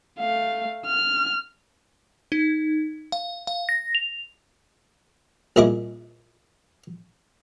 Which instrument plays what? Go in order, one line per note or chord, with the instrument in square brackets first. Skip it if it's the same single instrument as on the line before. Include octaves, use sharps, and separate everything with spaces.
[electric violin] A3 F5
F6
[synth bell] D#4
F5
F5
A#6
F7
[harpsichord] C2 A#2 E4 G#4 D#5 D6